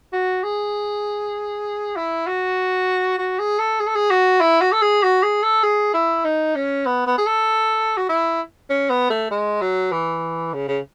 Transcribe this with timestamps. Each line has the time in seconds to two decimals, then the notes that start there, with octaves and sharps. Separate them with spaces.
0.13 F#4
0.44 G#4
1.96 E4
2.27 F#4
3.19 F#4
3.39 G#4
3.59 A4
3.80 G#4
3.87 A4
3.95 G#4
4.10 F#4
4.41 E4
4.61 F#4
4.72 A4
4.82 G#4
5.03 F#4
5.23 G#4
5.43 A4
5.64 G#4
5.94 E4
6.25 D#4
6.55 C#4
6.86 B3
7.07 B3
7.18 G#4
7.27 A4
7.97 F#4
8.09 E4
8.70 C#4
8.90 B3
9.10 A3
9.31 G#3
9.61 F#3
9.92 E3
10.53 C#3
10.68 C#3